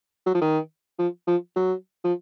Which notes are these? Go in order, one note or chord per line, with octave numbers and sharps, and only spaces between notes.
F#3
F3
D#3
F3
F3
F#3
F3